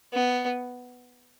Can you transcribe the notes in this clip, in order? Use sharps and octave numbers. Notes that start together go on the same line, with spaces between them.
B3